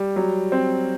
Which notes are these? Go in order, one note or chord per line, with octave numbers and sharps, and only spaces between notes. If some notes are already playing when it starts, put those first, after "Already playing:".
Already playing: G3
F#3
C4